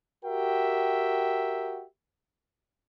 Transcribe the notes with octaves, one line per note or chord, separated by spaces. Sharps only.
F#4 G4 A#4 E5 G5